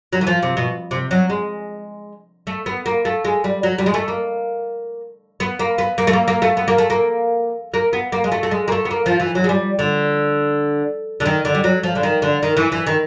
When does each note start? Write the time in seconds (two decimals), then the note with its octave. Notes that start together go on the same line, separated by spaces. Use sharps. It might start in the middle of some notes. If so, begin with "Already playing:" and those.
0.13 F#3
0.21 E3
0.27 F3
0.42 C3
0.57 B2
0.91 C3
1.11 F#3
1.30 G#3
2.47 A3
2.66 B3
2.86 A#3
3.05 A3
3.25 G#3
3.44 G3
3.63 F#3
3.79 G3
3.86 G#3
3.94 A3
4.08 A#3
5.40 B3
5.59 A#3
5.78 B3
5.98 A#3
6.07 A3
6.13 A#3
6.28 A#3
6.42 A3
6.57 B3
6.68 A#3
6.78 A3
6.90 A#3
7.74 A#3
7.93 B3
8.12 A#3
8.24 G#3
8.32 A3
8.43 A3
8.51 G#3
8.68 A#3
8.72 A3
8.85 B3
8.91 A#3
9.06 F3
9.20 E3
9.35 F#3
9.44 G#3
9.49 G3
9.79 D3
11.20 D3
11.26 D#3
11.45 D3
11.55 G3
11.64 F#3
11.83 F3
11.95 D3
12.03 D#3
12.22 D3
12.43 D#3
12.57 E3
12.72 E3
12.87 D#3